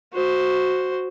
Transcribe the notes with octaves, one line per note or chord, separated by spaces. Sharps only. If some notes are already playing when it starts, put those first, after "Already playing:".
F#4 C5